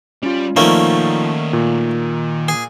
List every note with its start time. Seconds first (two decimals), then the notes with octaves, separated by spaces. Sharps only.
0.23 G3 C#4 F4
0.56 D#3 F3 A3 A#3 C#4 D#4 D5
1.53 A#2
2.48 G#4